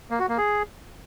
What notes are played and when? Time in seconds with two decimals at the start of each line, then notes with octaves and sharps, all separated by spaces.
0.11 A#3
0.20 F#4
0.29 A#3
0.38 G#4